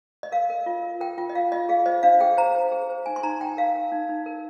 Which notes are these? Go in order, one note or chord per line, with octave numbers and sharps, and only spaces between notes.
D#5
A#4 F5
A#4
F4
A#4
A#4 G5
F4 G5
D#5
F4 F5
F4 D#5
G#4 F5
C5 D#5
D4 F5
G#4 G5
C5 A#5
C5
G#4
C5
D#4 G#5
C6
D#4 A#5
D#4 G5
A#4 F5
A#4
D#4
D#4
A#4